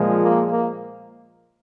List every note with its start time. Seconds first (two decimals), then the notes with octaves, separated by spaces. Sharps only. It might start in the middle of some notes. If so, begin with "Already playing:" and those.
Already playing: A#2 F3 G#3
0.21 A#3
0.49 A#3